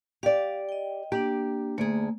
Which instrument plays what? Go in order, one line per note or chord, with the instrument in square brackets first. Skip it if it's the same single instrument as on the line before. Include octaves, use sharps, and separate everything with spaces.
[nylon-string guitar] G4 D5 [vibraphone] F5
[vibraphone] D#5 G5
[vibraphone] A#3 D4 [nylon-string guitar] G4
[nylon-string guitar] D2 G#4 [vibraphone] A3 A#3